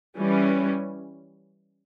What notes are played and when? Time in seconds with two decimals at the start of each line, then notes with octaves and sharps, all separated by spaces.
0.17 E3 G3 C#4